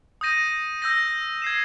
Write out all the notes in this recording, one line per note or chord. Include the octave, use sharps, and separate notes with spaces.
D#6 G6 A#6 D#7
E6 G6 A#6
G#6 C7 E7